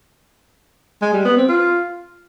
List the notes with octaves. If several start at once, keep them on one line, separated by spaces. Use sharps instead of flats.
G#3
G3
B3
C4
F4